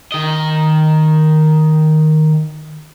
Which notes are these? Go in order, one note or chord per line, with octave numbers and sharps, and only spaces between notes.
D#3 D#5